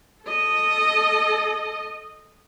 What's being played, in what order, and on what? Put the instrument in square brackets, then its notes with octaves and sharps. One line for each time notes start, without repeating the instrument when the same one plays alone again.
[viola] A4 D#5